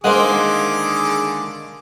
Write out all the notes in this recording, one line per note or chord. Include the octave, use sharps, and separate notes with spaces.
D3 D#3 G#3 A#3 G#4 C5 F#5 D6